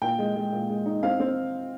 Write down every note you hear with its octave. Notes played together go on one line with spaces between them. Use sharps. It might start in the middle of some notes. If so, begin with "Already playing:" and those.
A#2 G5
G#3
G#3
A#2
G#3
D#4
C4 F5
C4